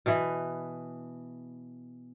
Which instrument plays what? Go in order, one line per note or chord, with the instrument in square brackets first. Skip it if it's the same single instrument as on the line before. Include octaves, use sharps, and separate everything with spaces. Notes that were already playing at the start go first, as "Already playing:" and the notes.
[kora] B2 E3